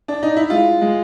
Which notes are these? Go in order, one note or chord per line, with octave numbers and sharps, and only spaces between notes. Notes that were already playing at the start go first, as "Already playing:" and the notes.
D4
D#4
E4
G#3 F4
G#3